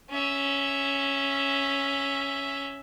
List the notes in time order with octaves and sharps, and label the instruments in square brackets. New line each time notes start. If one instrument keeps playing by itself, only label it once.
[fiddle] C#4 E5